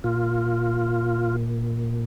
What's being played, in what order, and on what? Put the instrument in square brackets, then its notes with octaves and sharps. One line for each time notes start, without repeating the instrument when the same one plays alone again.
[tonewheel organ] A#2 F4